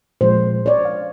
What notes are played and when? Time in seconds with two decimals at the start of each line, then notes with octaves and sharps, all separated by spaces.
0.21 A#2 F3 G#3 C5
0.66 C#5 D5
0.85 F5